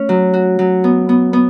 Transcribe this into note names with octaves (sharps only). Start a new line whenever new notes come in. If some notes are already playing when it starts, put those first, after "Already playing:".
Already playing: A3 C#4
F#3
F#4
F#3
B3
B3
B3